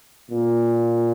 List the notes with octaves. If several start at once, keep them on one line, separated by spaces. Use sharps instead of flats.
A#2